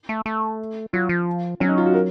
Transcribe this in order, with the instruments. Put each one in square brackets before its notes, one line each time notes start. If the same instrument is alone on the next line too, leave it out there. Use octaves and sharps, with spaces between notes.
[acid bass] A3
A3
[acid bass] F#3 [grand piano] F4
[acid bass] F3
[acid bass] F#3 [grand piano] C#4
[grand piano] D#4
F4
F#4
A#4